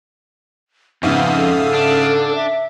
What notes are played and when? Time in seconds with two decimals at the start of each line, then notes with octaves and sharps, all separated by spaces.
1.03 F2 G#2 C#3 B3 E5 F5 D#6
1.37 A4
1.74 D4
2.36 E5